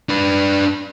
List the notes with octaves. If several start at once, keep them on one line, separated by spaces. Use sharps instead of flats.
D4 B4